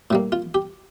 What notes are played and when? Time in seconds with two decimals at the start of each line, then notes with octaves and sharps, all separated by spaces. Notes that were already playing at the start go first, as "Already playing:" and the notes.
0.11 A2 G3 A#3
0.32 F4
0.54 G4